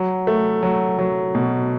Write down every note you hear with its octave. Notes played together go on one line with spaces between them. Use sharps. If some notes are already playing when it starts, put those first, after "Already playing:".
Already playing: F#3
A3
F#3
F#3
B2